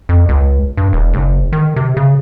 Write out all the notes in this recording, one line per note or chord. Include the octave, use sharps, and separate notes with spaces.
F2
C#2
G2
E1
F#1
D#3
C3
C#3